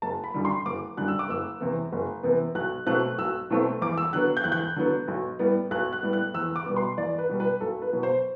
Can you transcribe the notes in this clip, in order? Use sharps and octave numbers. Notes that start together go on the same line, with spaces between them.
F#1 A5
B5
F#2 D3 G3
C6
F#1 D6
F#2 D3 G3 F#6
E6
D6
F#1 E6
E2 C3 E3 B3
F#1
E2 C3 E3 B3
B1 F#6
B2 F#3 A3 C4 F#6
B1 E6
B2 F#3 A3 C4
E2 D6
E6
D3 F#3 B3 F#6
G6
E2 F#6
G6
D3 F#3 B3
B1
A2 G3 B3
B1 F#6
F#6
A2 G3 B3
F#6
E2 E6
D6
B2 G3 B3
C6
E2 D5
B4
B2 G3 B3
B4
B1 A4
B4
B2 F#3 B3
C5